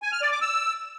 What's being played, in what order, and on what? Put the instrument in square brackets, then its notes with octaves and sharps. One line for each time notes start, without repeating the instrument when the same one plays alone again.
[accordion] G#5
F6
D5
D6
E6